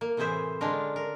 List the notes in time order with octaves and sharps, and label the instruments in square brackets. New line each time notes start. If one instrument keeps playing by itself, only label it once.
[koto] A#3
A2 C3 E3 G#4 C5 E5
D3 G#3 C#4 D4 F4 A#4
A#4